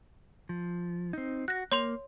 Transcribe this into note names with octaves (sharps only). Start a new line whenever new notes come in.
F3
C4 D#4
F#4 F#6 A#6
A#3 C#5 C6 F7